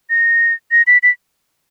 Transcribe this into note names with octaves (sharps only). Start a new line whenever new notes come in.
A#6
A#6
B6
B6